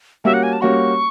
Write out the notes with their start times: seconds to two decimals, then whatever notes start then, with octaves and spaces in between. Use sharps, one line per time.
0.24 G3 A#3 C#4 F#4 E5
0.34 F#5
0.43 G#5
0.53 A5
0.61 G3 A#3 C#4 F#4 C#6